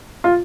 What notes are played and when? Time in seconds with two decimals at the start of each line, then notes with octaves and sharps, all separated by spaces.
0.24 F4